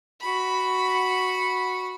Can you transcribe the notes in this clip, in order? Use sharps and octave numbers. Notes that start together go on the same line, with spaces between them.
F#4 B5